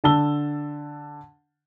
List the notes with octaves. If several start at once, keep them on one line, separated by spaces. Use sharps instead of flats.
D3 A5 E6 G7